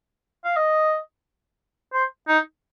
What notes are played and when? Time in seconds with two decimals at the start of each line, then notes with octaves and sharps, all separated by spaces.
0.44 F5
0.56 D#5
1.93 C5
2.28 D#4